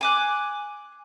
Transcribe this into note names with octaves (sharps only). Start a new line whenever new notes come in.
G#5 D6 F#6